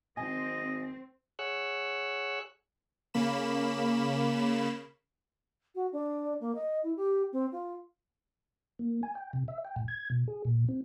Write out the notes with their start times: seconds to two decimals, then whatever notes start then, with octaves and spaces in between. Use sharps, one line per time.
0.17 G#1 C4 D#5 G#5
1.39 G#4 C#5 F#5 E6 F#6
3.14 C#3 A#3 B5 E7
5.75 F#4
5.93 D4
6.40 A#3
6.55 D#5
6.83 E4
6.96 G4
7.33 C4
7.52 F4
8.79 A#3
9.03 G#5
9.15 G5
9.33 C3
9.48 E5
9.65 G5
9.76 A2
9.88 G#6
10.10 B2
10.28 G#4
10.45 A#2
10.68 C4